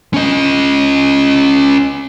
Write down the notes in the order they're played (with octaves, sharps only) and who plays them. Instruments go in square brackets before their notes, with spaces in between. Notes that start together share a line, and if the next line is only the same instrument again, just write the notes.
[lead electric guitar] C#4 D#5